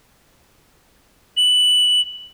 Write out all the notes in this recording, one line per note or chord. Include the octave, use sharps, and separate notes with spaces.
F#7